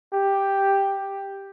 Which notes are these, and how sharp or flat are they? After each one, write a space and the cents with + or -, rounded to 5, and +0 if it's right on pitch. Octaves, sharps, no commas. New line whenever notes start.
G4 +5